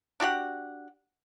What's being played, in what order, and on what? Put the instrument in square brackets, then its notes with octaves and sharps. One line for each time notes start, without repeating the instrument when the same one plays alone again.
[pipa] D4 F#4 G4 F#5